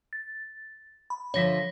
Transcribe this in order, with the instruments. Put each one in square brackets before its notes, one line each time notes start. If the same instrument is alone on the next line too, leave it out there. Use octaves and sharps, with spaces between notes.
[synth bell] A6
B5
[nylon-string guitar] D3 F3 E5 [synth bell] C#5 A#6 B6